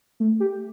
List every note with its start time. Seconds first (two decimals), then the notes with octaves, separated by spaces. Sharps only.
0.20 A3
0.40 G4